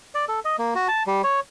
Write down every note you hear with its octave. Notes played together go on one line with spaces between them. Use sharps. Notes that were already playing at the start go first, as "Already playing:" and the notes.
D5
A4
D#5
A#3
F#4
A5
G3
C#5